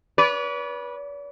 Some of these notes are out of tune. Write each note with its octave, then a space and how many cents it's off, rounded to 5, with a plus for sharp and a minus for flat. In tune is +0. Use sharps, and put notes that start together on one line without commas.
B4 -20 D5 -45